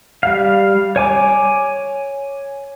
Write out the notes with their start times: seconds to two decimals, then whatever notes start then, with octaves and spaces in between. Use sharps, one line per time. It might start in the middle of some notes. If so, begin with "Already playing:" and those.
0.23 G3 F5
0.96 C#5 G#5 D6